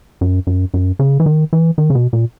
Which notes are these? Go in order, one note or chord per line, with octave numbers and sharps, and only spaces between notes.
F#2
F#2
F#2
C#3
E3
D#3
E3
D#3
C#3
B2
A#2